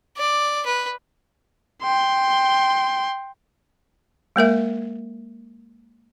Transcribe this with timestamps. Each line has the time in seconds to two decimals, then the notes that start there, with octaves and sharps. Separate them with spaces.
0.18 D5
0.66 B4
1.83 G5 C6
4.36 G#3 A#3 A#4 E5